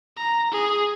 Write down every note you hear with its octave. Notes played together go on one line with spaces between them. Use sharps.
A#5
G#4